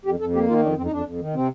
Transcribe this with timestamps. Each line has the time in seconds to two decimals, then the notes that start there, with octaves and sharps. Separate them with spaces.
0.05 F2 G4
0.20 F2 A4
0.34 A#3 G4
0.48 D#3 F4
0.62 F2 D4
0.77 F2 C4
0.85 D#4
0.91 F2 D4
1.06 F2
1.20 D#3
1.34 C3 C4